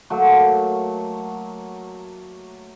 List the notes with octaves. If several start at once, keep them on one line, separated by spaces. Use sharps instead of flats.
F#3 A3 A#3